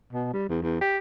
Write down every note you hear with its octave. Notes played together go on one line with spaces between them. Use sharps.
B2
G3
E2
E2
G4